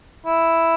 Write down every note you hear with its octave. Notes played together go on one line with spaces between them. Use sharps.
E4